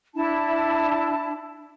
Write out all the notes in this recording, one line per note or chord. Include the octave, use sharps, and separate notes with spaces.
D4 E4 A5